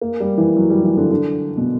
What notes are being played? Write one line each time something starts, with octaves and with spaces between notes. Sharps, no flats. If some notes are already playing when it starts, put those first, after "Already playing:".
A#3
G3
E3
F#3
G3
E3
D3
D3
B2